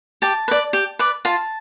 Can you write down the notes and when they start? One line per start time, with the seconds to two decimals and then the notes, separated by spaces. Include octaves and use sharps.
0.22 G4 A5
0.48 B4 D5
0.73 G4
0.99 B4 D5
1.25 F4 A5